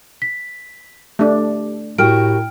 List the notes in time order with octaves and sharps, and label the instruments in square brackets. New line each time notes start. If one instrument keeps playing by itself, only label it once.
[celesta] B6
[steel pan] A3 D4 [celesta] G4
[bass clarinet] A2 [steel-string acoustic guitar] F#4 G4 A#4 [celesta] G5 F6 D7